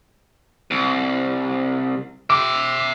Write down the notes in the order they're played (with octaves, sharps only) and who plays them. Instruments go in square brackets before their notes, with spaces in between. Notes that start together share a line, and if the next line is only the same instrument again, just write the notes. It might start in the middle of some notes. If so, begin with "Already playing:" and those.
[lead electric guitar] C2
[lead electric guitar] E5 G5 [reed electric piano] D6